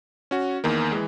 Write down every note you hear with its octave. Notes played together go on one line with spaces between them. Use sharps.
C#4 F#4
E2 D#3 A#3
E3 G#3